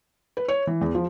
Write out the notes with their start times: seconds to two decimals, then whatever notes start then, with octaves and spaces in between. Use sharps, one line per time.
0.37 B4
0.48 C#5
0.67 E3
0.81 E2
0.95 F3